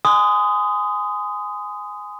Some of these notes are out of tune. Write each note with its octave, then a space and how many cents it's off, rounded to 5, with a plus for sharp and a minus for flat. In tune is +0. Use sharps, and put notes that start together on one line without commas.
G#5 +0 C6 -35 D#6 +0